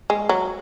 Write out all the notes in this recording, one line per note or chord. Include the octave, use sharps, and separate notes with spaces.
G#3
F#3